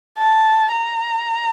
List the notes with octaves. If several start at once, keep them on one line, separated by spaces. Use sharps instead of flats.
A5
A#5